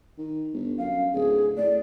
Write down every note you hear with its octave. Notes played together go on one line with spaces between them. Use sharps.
D#3
G1
F#2 F5
D1 G#4
A2 D5